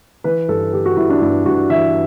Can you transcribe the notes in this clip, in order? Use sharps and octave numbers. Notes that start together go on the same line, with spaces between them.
E3 B4
G2 A4
E3 G4
F#4
G2 E4
D4
G2 E4
G2 F#4
E3 E5